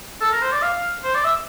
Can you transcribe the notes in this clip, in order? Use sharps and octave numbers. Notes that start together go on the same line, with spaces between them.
A4
A#4
C5
D5
F5
C5
D5
E5